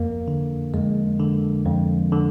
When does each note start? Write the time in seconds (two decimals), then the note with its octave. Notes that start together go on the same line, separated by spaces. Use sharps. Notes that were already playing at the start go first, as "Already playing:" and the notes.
Already playing: F2 A#3
0.28 D3
0.74 F2 G#3
1.20 D3
1.65 F2
2.12 D3